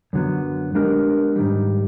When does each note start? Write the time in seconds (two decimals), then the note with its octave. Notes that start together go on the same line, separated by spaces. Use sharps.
0.13 F#2 D3 F#3 B3
0.74 G#3 B3 D4 G4 A#4
1.36 G#2 D#3 G3